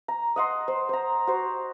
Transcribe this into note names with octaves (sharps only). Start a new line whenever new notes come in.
A#5
D#5 F#5 C6
C5
C5 A#5
F#4 C5